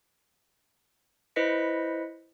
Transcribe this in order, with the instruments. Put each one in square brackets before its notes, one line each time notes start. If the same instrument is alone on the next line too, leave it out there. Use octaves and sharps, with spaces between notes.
[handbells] E4 B4 C5 D#5 B6 C#7